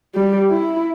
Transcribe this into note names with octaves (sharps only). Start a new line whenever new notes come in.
G3
E4